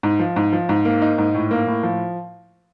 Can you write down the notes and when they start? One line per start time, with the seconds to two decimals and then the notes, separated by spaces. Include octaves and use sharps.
0.03 G#2
0.19 F3
0.36 G#2
0.53 F3
0.69 G#2
0.85 A#3
1.02 D#4
1.18 G#2
1.35 A2
1.51 A#3
1.67 A2
1.83 F3